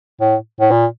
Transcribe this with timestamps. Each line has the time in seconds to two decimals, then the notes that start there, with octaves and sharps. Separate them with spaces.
0.21 A2
0.60 A2
0.71 A#2